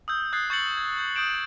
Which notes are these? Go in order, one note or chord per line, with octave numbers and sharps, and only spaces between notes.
D#6 E6 G6
D#6 F#6 G#6 A6 C7
C#6 G6 A6 C#7 F#7
G#6
G6
D#6 G6 A6 D7 E7